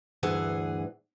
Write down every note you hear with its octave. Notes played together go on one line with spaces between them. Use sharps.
D2 G2 E3 G#4 F#5